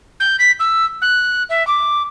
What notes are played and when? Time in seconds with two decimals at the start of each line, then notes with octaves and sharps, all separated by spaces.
0.20 G6
0.39 B6
0.59 E6
1.01 F#6
1.49 E5
1.67 D6